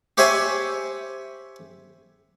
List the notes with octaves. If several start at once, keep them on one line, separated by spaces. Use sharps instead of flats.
G4 C5 C#5 E5 F#5 G#5